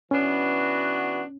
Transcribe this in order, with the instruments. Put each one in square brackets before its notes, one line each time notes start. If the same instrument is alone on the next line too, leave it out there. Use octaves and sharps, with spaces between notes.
[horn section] E3 B3 D4 F#4 [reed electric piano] C#4